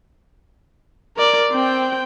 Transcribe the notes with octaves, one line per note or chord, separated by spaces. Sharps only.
A#4 D5
C4 G5